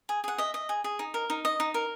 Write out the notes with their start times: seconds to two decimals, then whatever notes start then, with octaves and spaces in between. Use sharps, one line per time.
0.09 G#4
0.24 G#4 F#5
0.38 D#5 E5
0.54 D#5
0.69 G#4
0.84 G#4
0.99 D#4
1.14 A#4
1.30 D#4
1.45 D#5
1.60 D#4
1.74 A#4